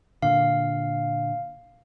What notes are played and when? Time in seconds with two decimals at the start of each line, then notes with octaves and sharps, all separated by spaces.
0.22 A#2 D3 F5